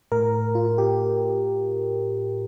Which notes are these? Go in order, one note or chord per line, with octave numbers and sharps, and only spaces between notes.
A2 A#4
F4
G4